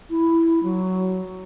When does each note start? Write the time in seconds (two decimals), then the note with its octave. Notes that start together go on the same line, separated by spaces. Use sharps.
0.10 E4
0.63 F#3